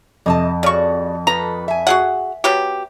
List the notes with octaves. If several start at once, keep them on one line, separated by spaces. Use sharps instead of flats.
F2 C3 D#5 A5
C#3 F#4 D5 C#6
F3 A4 B4 A#5
E5 G#5
F#4 G#4 F#5
F#3 B3 G4